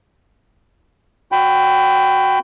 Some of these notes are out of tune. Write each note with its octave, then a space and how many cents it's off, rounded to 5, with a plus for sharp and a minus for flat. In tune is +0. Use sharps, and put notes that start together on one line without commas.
F#4 +0 G5 +0 B5 +25